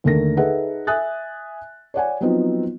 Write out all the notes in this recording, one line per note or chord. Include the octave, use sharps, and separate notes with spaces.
D#2 D3 A3 A#4 A#6
D#4 G#4 A4 B4 E5 F#5
E5 G#5 D#6 F#6 A6
C#5 D5 F#5 G#5
F3 F#3 B3 C4 D#4 F4